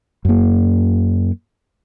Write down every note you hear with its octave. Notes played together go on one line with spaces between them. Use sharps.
F#2 A#3